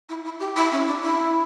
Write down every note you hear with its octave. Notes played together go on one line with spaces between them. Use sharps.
E4
E4
G4
E4
C#4
D4
E4